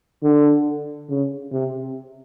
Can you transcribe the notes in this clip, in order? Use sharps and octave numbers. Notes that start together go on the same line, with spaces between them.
D3
C#3
C3